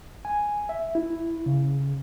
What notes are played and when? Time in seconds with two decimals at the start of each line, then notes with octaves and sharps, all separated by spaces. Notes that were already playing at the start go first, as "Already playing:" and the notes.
0.25 G#5
0.69 E5
0.95 E4
1.46 C#3